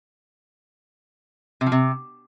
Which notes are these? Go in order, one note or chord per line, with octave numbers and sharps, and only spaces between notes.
C3
F3
C3